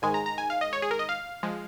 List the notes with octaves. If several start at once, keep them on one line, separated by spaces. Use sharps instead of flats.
G#2 D#3 G#3 G#5
A#5
A#5
G#5
F5
D#5
C#5
G#4
A#4
D#5
F5
F3 G#3